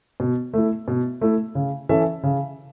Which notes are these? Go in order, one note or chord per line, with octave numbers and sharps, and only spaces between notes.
B2
A3 E4
B2
A3 E4
C#3
E3 C#4 A4 E5
C#3